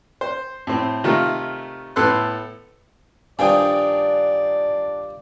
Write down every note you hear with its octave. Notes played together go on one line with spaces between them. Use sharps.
C5
A2 C4
C3 D#3 A3 F4 A#4
A2 B3 A4 C6 E6 F#6
G2 D#3 F3 D4 D5 G5 G#5 D#6